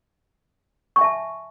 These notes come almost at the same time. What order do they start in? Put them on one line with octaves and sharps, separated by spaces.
C#6 G#5 E5 A5